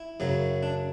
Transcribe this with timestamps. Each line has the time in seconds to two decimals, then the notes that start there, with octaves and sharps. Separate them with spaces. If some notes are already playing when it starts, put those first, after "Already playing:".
Already playing: E4
0.20 F#2 C#3 F#3
0.63 D4